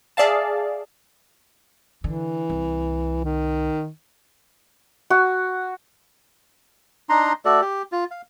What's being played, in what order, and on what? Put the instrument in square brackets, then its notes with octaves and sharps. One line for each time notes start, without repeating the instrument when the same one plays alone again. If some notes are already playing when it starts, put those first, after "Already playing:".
[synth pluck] G#4 D5 E5 F5 A5
[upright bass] D3 [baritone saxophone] E3
[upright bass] C2
[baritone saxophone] D#3
[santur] F#4
[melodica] D4 D#4 A#5 C6
A3 F#4 A4 D5
G4
F4
F5